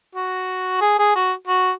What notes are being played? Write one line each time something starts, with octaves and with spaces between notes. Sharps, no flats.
F#4
G#4
G#4
F#4
F#4